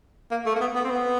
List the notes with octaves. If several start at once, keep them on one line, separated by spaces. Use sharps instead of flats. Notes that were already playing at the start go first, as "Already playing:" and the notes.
A#3
A3
A#3
B3
B3
C4
B3